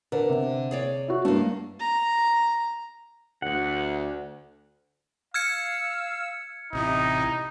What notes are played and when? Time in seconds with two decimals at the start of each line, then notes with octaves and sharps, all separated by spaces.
0.12 D3 A#4 B4
0.30 C3
0.71 G#4 C#5 D5
1.08 E4 F#4
1.25 G2 A3 A#3
1.80 A#5
3.42 D2 F#5
5.34 F5 E6 F6 G#6 C#7
6.73 A1 C3 D#4 E4